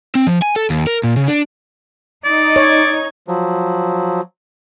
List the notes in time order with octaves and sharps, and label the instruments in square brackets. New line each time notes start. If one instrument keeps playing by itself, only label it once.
[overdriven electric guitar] C4
F3
G#5
A4
D#2
A#4
A#2
C#3
D4
[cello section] D#4 [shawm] D5
[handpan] C#5
[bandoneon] F3 F#3